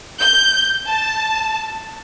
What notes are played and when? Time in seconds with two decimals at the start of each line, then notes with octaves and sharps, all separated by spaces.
0.20 G6
0.87 A5